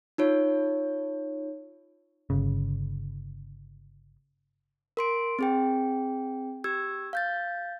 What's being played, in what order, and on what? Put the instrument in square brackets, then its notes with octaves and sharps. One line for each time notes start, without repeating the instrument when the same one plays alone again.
[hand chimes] D#4 F4 C#5
[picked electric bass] G1 C#3
[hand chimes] A#4 C6 D7
C4 G#4 G5
G4 E6 G#6
F5 G6 A6